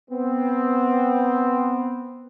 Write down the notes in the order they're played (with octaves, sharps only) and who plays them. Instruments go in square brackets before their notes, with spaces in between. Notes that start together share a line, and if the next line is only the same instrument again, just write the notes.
[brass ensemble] B3 C4